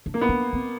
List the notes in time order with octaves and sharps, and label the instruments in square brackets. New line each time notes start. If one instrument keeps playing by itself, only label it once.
[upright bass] D4
[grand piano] A#3
B3
[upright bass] D4
C4